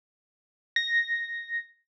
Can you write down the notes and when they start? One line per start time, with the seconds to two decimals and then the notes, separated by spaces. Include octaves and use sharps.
0.76 A#6